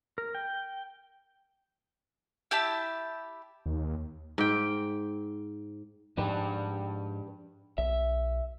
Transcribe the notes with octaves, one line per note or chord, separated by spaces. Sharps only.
A#4
G5
E4 G4 E5 A5
D#2
G#2 G5
G#2 F3 D4 G4 B4
B1 E5